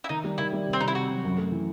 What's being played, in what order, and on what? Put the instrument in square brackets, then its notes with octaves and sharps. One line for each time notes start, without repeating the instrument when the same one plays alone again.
[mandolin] E4
[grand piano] D#3 [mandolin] D#4
[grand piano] G3
[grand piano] D#3 [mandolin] E4
[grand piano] G3
C3
[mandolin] C4
[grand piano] C3 [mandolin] D#4
[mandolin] E4
[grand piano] C3 [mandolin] F#4
[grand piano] F#3
F#2
A3
E3